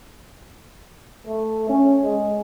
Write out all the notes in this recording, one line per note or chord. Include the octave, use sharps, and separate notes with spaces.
A3
C#4
G#3